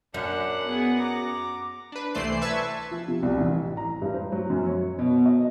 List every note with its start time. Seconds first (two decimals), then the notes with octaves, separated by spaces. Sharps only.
0.14 F#2 D4 F#5
0.66 B3 G#4
0.98 A#5 D6
1.92 D4 B4
2.15 C2 E3 A3 C5 D5 C7
2.41 B4 E5 A5 C#6 E6 G#6
2.91 F3
3.08 C3
3.23 C2
3.38 A1
3.77 A#5
4.02 G2
4.14 C5
4.32 F#3
4.50 F#2
4.66 C#5
4.99 B2
5.26 D#5